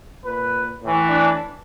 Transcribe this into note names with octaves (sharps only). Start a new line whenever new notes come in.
A#2 B4
A2 E3
D4